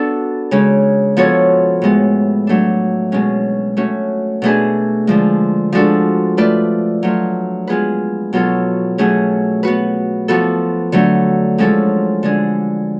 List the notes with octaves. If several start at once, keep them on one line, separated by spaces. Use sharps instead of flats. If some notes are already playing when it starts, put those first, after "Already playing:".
Already playing: B3 D4 F#4 A4
C#3 G#3 C#4
F3 B3 F#4 A4 C#5
A2 G#3 B3
F#3 A3 D4
B2 G#3 C#4
A3 C#4 F#4
B2 A3 D4 G#4 B4
D3 F3 G#3
F3 G#3 D4 F#4 A4
A3 F4 B4 D5
F#3 A3 F4
G#3 B3 F4 G#4 B4
B2 F#3 B3 F4 A4
B2 F#3 A3 C#4 G#4
B3 F#4 B4
F3 B3 F#4 A4
D3 F#3 A3
F3 G#3 C#4 F#4 A4
D3 G#3 D4 G#4